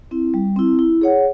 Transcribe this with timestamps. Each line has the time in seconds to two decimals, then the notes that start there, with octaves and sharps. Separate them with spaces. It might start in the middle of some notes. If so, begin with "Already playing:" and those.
0.11 C4 E4
0.34 G3
0.56 C4 E4
0.79 E4
1.01 G#4 C#5 F#5